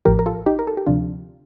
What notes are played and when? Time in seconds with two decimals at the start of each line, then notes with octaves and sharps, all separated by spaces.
0.05 A1 A2 F3 G4 A#4
0.19 A#4
0.26 F4 A4
0.46 D#4 G4
0.59 A#4
0.67 A4
0.77 G4
0.86 D2 C3 F3 D4 F4